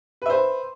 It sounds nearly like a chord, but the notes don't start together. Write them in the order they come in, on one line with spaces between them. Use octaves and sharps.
B4 E5 C5